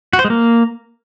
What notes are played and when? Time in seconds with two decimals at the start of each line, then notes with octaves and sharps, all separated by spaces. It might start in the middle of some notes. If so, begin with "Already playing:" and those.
0.13 F#4
0.19 C5
0.24 G#3
0.30 A#3